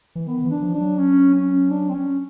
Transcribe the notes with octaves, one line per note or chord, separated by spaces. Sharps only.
E3
D#3 B3
E3
D4
F3
D4
F#3
C#4
C#4
D4
C4
C#4